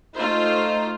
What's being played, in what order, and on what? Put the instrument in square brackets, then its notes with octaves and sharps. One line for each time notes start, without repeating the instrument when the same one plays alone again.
[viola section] A3 F4 C5 [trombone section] D#4